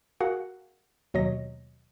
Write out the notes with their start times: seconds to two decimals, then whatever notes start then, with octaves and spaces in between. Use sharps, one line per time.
0.20 F#4 G#4 A#4 F5 F#5
1.14 D#2 B2 F#3 C#5 D#5 A#6